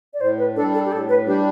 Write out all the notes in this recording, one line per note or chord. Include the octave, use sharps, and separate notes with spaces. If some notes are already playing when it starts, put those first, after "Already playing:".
D5
A2 C5
B4
G3 D4 A4
A4
G4
A2 A4
B4
G3 D4 G4